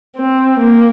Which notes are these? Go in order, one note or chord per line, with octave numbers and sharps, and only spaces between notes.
C4
A#3